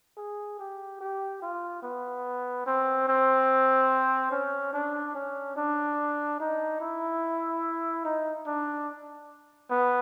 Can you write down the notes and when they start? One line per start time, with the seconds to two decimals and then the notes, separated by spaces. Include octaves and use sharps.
0.17 G#4
0.59 G4
1.01 G4
1.42 F4
1.83 B3
2.67 C4
3.08 C4
4.32 C#4
4.73 D4
5.15 C#4
5.57 D4
6.40 D#4
6.81 E4
8.05 D#4
8.47 D4
9.71 B3